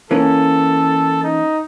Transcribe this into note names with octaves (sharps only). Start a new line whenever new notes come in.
E3 A#3 C#4 A4
D#4